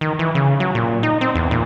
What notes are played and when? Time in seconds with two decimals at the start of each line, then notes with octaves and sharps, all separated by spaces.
0.01 D#3
0.19 E3
0.35 C#3
0.60 F#3
0.75 A#2
1.03 D#4
1.21 C4
1.35 E2
1.51 A#2